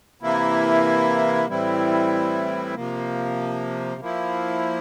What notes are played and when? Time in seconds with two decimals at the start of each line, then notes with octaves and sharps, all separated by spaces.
0.22 C3 E3 A#3 E4
1.48 A2 E3 G3 C4 E4
2.74 C3 F3 A#3
4.01 F3 A#3 E4